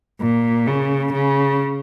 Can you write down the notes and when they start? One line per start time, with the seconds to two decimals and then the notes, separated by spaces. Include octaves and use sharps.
0.21 A#2
0.67 C#3
1.13 C#3